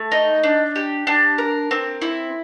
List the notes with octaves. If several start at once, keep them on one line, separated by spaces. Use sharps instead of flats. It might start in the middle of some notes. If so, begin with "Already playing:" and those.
Already playing: A3
D#4
D4
G4
D4
A#4
C4
E4